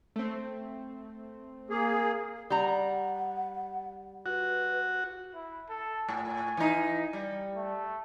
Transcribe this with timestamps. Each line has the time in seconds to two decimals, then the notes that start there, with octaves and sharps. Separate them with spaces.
0.16 A3 C4
1.70 A#3 G#4
2.50 G3 F#5 A#5
4.26 F#4 B4
5.34 E4
5.69 A4
6.09 A2 G#5
6.57 E3 D#4
7.13 G3
7.55 A3